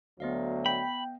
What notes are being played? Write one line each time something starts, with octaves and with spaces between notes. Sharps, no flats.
D2 F#3 B3 D#5 F5
G5 B5